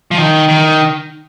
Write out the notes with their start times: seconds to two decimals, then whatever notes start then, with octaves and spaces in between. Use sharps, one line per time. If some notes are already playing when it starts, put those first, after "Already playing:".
0.11 F3
0.17 D#3
0.48 D#3